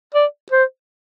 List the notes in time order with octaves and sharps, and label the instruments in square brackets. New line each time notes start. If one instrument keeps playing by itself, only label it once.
[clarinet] D5
C5